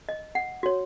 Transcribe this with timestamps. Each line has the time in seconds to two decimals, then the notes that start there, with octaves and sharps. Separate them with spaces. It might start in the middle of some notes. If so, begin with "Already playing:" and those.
0.09 D#5
0.35 F#5
0.63 F#4 C#5